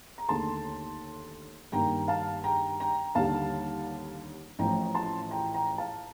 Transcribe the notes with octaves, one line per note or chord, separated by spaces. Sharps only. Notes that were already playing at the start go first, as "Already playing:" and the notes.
A#5
D#2 D3 A3 A5 C6
G2 D#3 A#3 G5 A#5
F5 A5
G5 A#5
G5 A#5
D#2 D3 G3 F5 A5
A1 A2 F3 G5 A#5
A5 C6
G5 A#5
G5 A#5
F5 A5